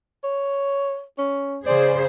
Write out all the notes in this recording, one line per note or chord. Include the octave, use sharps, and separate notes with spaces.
C#5
C#4
C#3 G#4 C5 D5